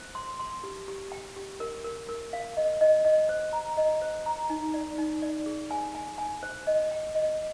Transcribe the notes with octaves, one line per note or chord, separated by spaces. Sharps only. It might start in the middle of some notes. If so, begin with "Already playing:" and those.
Already playing: C5
C6
C6
G4
G4
G5
G4
A#4
A#4
A#4
F5
D#5
D#5
D#5
C5
A#5
D#5
C5
A#5
D#4
D5
D#4
D5
G#4
G#5
G#5
G#5
C5
D#5
G5
D#5